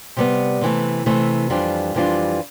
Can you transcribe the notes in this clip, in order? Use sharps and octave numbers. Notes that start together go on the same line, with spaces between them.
C3 G3 B3
C3 E3 A3
C3 E3 A3
F2 E3 G3 D4 F4
F2 E3 G3 D4 F4